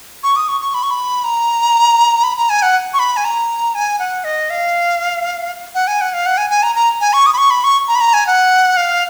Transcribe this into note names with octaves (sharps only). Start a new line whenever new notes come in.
C#6
D#6
C#6
C#6
B5
C#6
B5
A#5
B5
A#5
G#5
F#5
C#6
B5
G#5
A#5
G#5
F#5
D#5
F5
F#5
G#5
F#5
F5
F#5
G#5
G#5
A#5
A#5
G#5
C#6
D#6
B5
C#6
B5
C#6
A#5
B5
A#5
G#5
F#5
F5